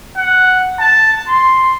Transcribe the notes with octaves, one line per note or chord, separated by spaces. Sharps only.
F#5
A5
C6